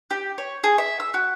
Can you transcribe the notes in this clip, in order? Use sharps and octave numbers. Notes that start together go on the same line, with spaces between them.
G4
C#5
G#4
E5
E6
F#4